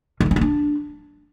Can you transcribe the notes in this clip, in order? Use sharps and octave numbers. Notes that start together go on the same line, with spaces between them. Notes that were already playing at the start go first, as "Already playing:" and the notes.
D#3
A3
C#4
B3
D4